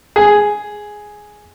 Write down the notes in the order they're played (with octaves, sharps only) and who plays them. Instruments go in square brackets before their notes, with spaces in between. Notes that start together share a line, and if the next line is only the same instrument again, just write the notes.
[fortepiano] G#4